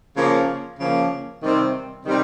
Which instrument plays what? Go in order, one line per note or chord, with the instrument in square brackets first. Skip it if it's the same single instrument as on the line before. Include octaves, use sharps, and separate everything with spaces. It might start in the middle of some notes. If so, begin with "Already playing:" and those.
[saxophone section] C#3 F3 A#3
C#3 F3 A#3
C3 D#3 G3 C4
C3 D#3 G3 C4